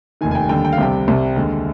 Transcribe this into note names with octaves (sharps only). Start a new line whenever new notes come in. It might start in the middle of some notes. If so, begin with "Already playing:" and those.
F1 D#2 D#3 G#5
G#5
G5
D#2 D3 G3 G5
G5
F5
C2 C3 G3 G5
C2 C3 G3
D#2 D3 G#3